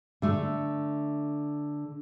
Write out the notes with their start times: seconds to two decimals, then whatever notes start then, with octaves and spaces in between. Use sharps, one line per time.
0.22 D3 A3